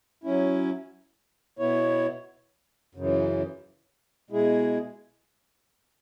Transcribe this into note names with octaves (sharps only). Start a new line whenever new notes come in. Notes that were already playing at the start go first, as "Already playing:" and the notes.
F#3 C#4 E4
B2 B3 E4 C#5
F#2 C#3 E3
B2 G#3 E4 G#4